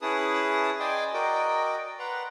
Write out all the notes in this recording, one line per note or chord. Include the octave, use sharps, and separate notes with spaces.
C#4 E4 G#4 B4 A5 D#6
D5 D#5 G5 G#5 C6 D6
F#4 A#4 D5 D#5 G5
B4 F#5 A#5 C6